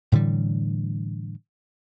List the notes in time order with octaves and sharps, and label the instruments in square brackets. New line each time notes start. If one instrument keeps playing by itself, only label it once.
[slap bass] A2 D3 E3 G3